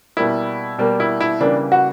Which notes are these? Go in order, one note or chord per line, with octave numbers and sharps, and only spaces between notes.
B2 G3 A#3 E4
B2 G3 A#3
E4
E4
C#3 E3 G3 A#3 D4
F#4